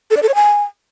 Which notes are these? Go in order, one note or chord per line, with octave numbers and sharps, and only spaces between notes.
A4
D5
A4
C#5
G#5